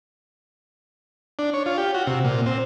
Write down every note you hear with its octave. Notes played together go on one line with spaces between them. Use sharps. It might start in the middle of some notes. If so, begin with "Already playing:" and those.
D4
C#5
F4
G4
F#4
C3
A#2
C4